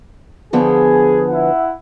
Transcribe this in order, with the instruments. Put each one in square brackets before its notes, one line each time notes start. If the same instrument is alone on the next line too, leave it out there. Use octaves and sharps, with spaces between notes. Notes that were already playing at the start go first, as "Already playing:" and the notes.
[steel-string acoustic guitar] D3 F3 B3 [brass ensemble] G#4
[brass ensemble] E4 E5 F#5